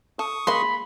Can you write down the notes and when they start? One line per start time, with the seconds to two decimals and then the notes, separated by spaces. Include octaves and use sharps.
0.19 A4 C#6 D#6
0.47 G#3 A#3 B5 C6